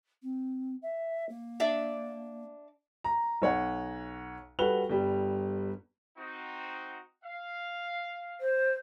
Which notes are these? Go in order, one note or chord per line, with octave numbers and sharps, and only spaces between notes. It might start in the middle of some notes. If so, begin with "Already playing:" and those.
C4
E5
A#3
D4 D5 E5
A#5
B1 C#5 F#5
G3 F#4 A4 B4 F7 G7
G1 G3
C4 D#4 F#4
F5
C5